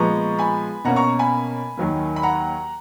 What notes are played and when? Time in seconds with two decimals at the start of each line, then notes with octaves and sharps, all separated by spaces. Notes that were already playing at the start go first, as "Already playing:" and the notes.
Already playing: A#2 F3 G#3 B3 A#5 C#6
0.39 G#5 B5
0.84 B2 A#3 C#4 F#5 A#5
0.96 A#5 C#6
1.19 G#5 B5
1.77 D#2 D#3 F#3 A#3
2.16 B5
2.23 F#5 A#5